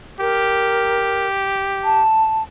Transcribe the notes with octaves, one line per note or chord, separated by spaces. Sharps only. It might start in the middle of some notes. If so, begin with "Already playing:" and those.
G4 A#4
A5